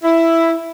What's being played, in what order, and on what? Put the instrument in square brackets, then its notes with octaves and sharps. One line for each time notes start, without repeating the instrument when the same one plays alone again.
[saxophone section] E4